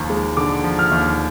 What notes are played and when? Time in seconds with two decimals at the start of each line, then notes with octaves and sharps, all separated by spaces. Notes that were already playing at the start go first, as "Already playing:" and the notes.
Already playing: D#2 F3 A#5
0.10 G#3
0.37 D3 D6
0.64 F3
0.79 F6
0.91 D#2